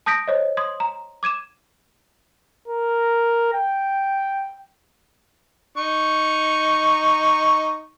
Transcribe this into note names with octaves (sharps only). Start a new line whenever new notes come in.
A5 D#6 G6 A#6 B6 D7
C5 C#5 D#5
C6 D#6 G#6
A#5
D6 G#6 D#7 E7
A#4
G5
D#4 C#6